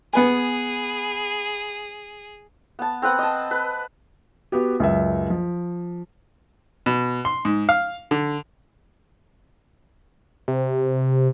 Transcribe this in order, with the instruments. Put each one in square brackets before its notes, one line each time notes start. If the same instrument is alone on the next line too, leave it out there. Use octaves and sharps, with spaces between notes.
[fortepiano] B3 B4 G#5 [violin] G#4
[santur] B3 A5
C4 A#4 B4 F#5
D#5 A5
B4
[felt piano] B3 F#4 G4
C#2 F#2 E5
F3
[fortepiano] B2
C6
G#2
F5
D3
[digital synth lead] C3